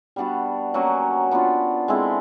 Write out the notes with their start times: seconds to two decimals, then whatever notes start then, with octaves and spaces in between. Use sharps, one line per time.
0.16 G3 B3 D4 F#4
0.74 F#3 A#3 C#4 F#4
1.31 B3 D4 F4
1.88 G#3 C4 E4 A4